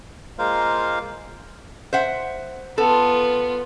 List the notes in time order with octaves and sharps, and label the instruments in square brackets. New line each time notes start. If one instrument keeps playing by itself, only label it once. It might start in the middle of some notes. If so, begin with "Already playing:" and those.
[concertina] G#3 A#3 F4 A#4 C5 F5
[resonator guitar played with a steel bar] C5 E5 F#5
[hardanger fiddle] B3 F4 [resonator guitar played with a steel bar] A4